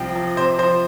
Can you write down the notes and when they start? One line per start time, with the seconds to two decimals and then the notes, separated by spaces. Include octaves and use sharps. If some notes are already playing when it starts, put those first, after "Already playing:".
Already playing: C2 F3 G5
0.16 F3
0.37 C3 C5
0.58 F3 C5